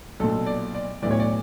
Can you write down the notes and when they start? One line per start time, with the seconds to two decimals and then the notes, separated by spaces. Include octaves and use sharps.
0.20 B1 A#2 A4
0.47 D5
0.75 D5
1.02 B1 A2 E3 D5
1.11 C#5
1.20 D5